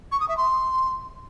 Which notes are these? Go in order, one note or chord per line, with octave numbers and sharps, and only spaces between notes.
C#6
D#6
E5
C6